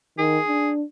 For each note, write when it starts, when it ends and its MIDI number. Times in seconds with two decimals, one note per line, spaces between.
0.18 0.38 51
0.18 0.71 68
0.47 0.84 62